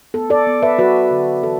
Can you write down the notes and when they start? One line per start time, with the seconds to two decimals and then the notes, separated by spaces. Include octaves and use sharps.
0.14 B3 A4
0.30 A4 D5
0.47 B3
0.62 B4 E5
0.78 F#3 F#4 B4
1.11 D3
1.43 E3 A4